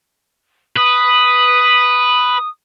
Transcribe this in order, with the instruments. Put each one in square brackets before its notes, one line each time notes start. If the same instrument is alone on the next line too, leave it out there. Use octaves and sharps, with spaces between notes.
[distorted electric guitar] B4 [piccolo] D#6